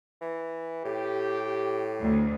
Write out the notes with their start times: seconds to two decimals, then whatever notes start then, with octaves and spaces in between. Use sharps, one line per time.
0.21 E3
0.85 A2 G4
2.00 D2